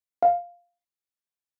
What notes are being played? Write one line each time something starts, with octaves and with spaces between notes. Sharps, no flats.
F5